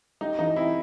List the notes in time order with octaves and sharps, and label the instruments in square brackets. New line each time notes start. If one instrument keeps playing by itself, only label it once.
[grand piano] G3 [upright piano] D#4
[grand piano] E3 [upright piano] D#4
[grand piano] C4 [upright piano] E4